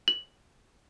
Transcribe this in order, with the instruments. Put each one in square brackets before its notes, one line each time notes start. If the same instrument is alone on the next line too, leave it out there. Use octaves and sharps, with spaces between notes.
[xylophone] F#7